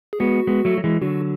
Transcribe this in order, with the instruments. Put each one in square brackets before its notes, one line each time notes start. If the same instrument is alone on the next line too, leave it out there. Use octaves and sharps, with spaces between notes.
[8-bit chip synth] G#4
[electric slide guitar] G#3 B3 [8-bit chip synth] F#4
[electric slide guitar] G#3 B3
F#3 A3
F#3
E3 G#3
[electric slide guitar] D3 F#3 [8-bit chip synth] F#4